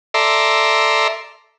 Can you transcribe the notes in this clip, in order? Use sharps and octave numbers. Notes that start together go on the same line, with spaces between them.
A4 D5 E5 A#5 C6